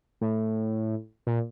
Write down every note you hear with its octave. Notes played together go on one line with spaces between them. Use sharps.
A2
A#2